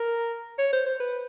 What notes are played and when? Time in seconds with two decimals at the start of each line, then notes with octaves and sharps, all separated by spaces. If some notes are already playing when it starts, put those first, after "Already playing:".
Already playing: A#4
0.58 C#5
0.73 C5
0.85 C5
1.00 B4